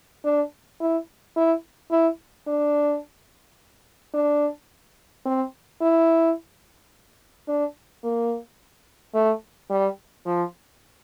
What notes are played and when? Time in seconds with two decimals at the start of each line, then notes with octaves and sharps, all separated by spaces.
0.25 D4
0.80 E4
1.36 E4
1.91 E4
2.47 D4
4.14 D4
5.25 C4
5.81 E4
7.48 D4
8.04 A#3
9.14 A3
9.70 G3
10.26 F3